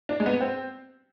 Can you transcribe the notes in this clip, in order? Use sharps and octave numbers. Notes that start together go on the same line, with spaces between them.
D4
G#3
B3
C4